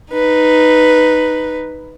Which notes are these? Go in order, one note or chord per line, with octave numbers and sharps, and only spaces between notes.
D#4 B4